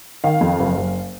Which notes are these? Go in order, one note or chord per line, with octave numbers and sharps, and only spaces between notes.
D#3 F5
F2
F#1
F#1